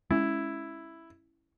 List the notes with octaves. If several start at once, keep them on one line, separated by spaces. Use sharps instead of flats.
G#3 C#4 E4